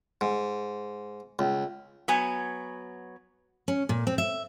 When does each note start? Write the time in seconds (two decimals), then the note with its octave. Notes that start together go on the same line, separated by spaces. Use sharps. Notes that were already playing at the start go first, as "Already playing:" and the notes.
0.21 G#2
1.39 C#2
2.08 F#3 B3 G#5
3.68 C#4
3.89 A#2
4.07 C4
4.18 E5